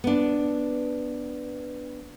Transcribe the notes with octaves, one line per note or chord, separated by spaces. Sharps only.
B3 D4